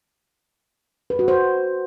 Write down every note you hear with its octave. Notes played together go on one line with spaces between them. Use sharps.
B4
F#4
C5